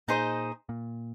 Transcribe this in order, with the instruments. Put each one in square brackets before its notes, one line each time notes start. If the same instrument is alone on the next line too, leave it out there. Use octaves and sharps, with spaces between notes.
[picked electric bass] A#2 [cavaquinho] D#4 G#4 C5 D#5
[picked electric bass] A#2